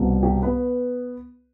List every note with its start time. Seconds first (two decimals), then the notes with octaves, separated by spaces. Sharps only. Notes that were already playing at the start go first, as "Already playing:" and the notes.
Already playing: C2 B2 G3
0.23 G4
0.42 B3 B4